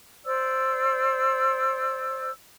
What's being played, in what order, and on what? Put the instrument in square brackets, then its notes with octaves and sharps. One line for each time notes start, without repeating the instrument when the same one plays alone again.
[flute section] C5 D5 E6